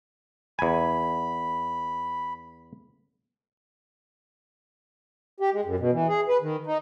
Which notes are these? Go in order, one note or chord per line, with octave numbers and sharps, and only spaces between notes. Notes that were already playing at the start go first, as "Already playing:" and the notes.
E2 G#5 B5
G4
G#3
F#2
B2
E3
G#4
B4
D#3
D#4